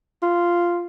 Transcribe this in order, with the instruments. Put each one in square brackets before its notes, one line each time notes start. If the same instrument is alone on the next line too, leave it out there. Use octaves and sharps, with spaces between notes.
[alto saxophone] F4